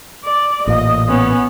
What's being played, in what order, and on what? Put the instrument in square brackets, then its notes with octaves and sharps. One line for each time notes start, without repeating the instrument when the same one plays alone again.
[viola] D5
[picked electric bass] A1 A#2 [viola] D#5
[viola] B3 C#4